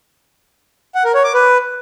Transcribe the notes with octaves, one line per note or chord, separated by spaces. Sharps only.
F#5
A#4
C#5
D6
B4